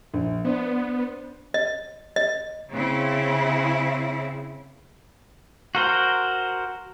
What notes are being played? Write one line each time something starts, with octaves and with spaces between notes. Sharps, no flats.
A#1
B3 D4 C5
D#5
D#5
C#3 C4 E4
F#4 A#4 C5